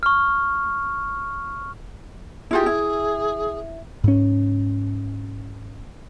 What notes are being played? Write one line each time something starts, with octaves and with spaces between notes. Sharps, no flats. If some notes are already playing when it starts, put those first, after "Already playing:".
C#6 F6
E4 F4 G4 G#4
E4
G#2 C#4